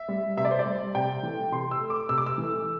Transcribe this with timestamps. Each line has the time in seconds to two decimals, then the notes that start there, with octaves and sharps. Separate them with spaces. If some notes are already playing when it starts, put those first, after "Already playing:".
Already playing: E5
0.08 G3
0.37 C3 E5
0.45 D5
0.51 C5
0.59 D5
0.65 G3
0.95 C3 G5
1.23 E3 A3
1.51 C3 C6
1.71 E6
1.81 A3
1.90 D6
2.09 C3 E6
2.18 D6
2.26 E6
2.38 E3 A3